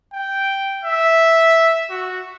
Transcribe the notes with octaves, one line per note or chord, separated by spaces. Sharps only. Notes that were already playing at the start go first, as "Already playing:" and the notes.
G5
E5
F#4